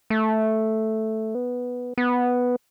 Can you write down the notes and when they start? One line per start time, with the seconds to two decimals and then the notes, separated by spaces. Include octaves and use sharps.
0.10 A3
1.35 B3
1.98 B3